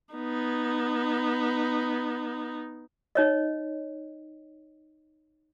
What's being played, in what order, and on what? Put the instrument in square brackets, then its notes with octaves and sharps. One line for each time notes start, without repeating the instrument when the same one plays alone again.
[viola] B3 D#4
[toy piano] D#4 C#5 D#5